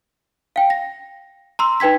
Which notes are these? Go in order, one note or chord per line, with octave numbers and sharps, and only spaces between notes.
F5 G5
A#6
A#5 C6 E6
D#4 B4 G5 G#6 B6